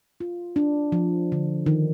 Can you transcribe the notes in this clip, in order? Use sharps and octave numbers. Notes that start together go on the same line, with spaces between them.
F4
D4
F3
D3
D#3